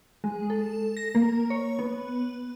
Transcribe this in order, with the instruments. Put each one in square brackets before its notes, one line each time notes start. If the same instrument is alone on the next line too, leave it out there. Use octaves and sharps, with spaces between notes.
[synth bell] G#3
A4
A#6
A#3
C#5
B3